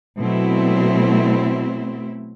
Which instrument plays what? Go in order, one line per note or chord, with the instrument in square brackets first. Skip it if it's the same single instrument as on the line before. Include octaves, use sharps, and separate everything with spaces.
[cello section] B2 F#3 A3 C4 E4